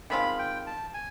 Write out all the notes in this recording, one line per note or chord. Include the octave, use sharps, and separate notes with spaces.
D#3 G#3 C4 F4 B5
G5
A5
G#5